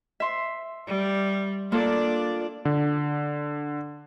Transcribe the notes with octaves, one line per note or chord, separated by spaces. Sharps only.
E5 C6
G3
A#3 D4 F4 A4 D5
D3